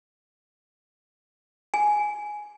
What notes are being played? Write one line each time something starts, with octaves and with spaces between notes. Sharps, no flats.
G#5